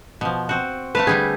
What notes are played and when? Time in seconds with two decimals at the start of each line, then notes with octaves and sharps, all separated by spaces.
0.21 B2 F3
0.49 C4 F#4
0.95 A3 B4 F5 A5
1.07 D3 G3 A3 G#4